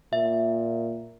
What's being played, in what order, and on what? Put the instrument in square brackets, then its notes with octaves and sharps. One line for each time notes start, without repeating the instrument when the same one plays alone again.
[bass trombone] A#2 [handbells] E5